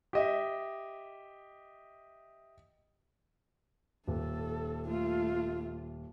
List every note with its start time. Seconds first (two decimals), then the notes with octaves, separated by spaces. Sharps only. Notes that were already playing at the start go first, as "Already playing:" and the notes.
0.13 G4 D#5 E5
4.07 D#1 A4
4.87 A3 F4